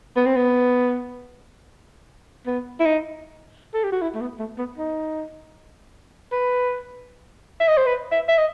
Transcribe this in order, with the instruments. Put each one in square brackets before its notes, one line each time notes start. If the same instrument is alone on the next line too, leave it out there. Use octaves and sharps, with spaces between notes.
[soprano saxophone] B3
C4
B3
B3
E4
D#4
A4
G4
F#4
E4
A3
B3
A3
B3
D#4
B4
E5
D#5
C5
B4
E5
E5
D#5